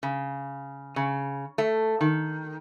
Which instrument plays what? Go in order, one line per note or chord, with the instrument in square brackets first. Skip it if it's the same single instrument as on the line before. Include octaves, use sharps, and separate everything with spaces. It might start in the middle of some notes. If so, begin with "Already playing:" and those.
[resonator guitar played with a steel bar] C#3
C#3
A3
D#3